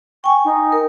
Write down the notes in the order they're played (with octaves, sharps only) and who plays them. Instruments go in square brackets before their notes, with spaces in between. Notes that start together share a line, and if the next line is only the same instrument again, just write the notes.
[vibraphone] G5 G#5 [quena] C#6
[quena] D#4
[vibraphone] A#4